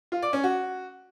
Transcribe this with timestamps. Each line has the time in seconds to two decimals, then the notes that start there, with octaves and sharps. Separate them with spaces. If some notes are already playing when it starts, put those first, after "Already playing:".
0.12 F4
0.22 D5
0.33 C#4
0.44 F#4